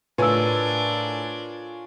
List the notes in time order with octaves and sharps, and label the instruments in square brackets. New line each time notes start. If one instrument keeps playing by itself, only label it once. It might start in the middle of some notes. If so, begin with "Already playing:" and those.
[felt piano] A2 [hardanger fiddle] D4 A#4 [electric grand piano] F4 C#5 G#5 [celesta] B4 E6